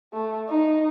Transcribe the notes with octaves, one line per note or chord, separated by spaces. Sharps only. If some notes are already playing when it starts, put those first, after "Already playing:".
A3
D#4